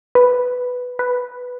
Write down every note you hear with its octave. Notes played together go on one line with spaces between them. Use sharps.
B4
B4